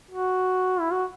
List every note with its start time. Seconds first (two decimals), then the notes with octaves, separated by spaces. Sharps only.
0.11 F#4
0.80 E4
0.92 F#4